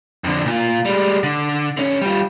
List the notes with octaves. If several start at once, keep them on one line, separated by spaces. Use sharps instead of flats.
F2 D3
A#2 F4
G3 G#3
D3
D3 C#4
G3 F4